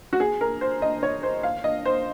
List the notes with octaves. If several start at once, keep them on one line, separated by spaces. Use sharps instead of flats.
F#4
G#4
A#4
C5
D#5
C#5
C5
F5
D#5
C5